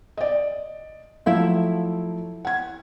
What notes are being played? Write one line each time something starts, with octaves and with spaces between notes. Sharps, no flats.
D5 D#5
F3 F#3 A3 E4 E5 F5
F#5 G#6